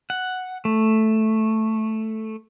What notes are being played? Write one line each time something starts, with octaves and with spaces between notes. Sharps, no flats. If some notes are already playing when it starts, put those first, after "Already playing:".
F#5
A3